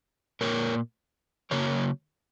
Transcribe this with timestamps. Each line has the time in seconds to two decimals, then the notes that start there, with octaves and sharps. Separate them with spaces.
0.41 A#2 A#3 A#4 C#5
1.51 C#3 F#3 A#3 A#4 C#5